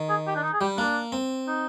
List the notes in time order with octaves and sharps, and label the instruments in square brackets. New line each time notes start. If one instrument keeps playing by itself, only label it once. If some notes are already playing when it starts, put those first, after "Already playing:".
Already playing: [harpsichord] D#3
[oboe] G#4
G4
D4
D#4
G#4
[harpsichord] G3 [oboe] G4
[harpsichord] A#3 [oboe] D4
[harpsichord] C4
[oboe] D#4